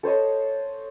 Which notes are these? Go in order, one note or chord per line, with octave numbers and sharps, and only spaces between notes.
A4 C5 C#5 D#5